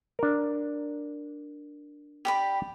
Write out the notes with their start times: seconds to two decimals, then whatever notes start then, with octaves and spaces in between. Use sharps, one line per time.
0.19 D4 A#4
2.25 G4 D5 B5